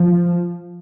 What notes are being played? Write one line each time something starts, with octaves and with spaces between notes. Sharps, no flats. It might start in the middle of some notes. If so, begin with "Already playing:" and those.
Already playing: F3